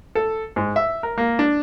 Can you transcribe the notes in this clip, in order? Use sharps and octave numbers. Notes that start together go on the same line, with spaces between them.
A4
G#2
E5
A#4
A#3
D4